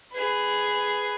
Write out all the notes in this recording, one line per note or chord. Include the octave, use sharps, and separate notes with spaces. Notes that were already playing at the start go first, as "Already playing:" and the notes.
G#4 B4